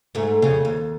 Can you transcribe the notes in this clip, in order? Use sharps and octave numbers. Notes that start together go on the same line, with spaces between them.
G#2 A3
F2 C#3
D#2